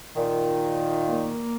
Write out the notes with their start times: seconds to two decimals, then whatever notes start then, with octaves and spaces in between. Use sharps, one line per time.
0.16 A#2 D#3
1.09 A#3